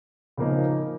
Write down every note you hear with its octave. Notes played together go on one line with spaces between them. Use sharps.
C#3 F3 A#3 D#4